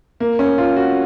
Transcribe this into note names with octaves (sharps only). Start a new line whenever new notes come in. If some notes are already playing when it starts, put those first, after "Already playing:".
A#3
C#4
F4
F#4